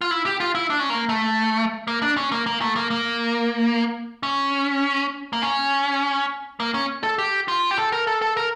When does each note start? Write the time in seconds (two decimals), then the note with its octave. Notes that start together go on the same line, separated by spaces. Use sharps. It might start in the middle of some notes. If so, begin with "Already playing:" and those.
0.01 F4
0.11 E4
0.26 G4
0.40 F4
0.55 E4
0.70 D4
0.80 C#4
0.90 A#3
1.09 A3
1.88 A#3
2.02 D4
2.17 C#4
2.32 A#3
2.46 A#3
2.61 A3
2.76 A#3
2.91 A#3
4.23 C#4
5.33 A#3
5.42 C#4
6.60 A#3
6.74 C#4
7.03 A4
7.18 G4
7.48 F4
7.71 G4
7.78 A4
7.92 A#4
8.07 A4
8.22 A4
8.37 A#4